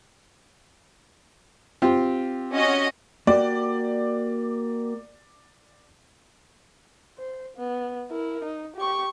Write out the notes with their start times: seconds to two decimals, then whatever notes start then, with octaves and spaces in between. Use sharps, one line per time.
1.82 C4 F4 G4
2.55 C#4 F#4 D#5
3.27 A#3 F#4 G4 D5
7.18 C5
7.57 B3
8.11 E4 A#4
8.44 D#4
8.76 G4 C#6